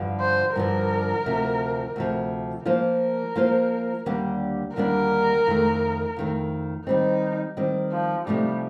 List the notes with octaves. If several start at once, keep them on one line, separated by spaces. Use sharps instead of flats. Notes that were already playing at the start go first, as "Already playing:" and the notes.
Already playing: G2 D3 F3
C5
G2 D3 F3 A#4
D2 C3 F3
D2 C3 F3
F3 A#3 F4 A#4 C5
F3 A#3 F4 C5
D#2 D3 G3 A#3 D4
D#2 D3 G3 A#3 D4 A#4
F2 D#3 A3
F2 D#3 A3
D#3 G3 C4 D#4
D#3 G3 C4
F3
C3 F3 G3 A3 D#4